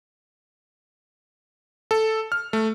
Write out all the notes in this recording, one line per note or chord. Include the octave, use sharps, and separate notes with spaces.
A4
F6
A3